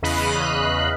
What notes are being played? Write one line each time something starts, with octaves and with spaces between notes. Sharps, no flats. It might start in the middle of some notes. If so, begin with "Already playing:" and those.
E2 C#3 D#5 F5 B5 F#6